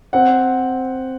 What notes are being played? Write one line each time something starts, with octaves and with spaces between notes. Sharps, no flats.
C4 F#5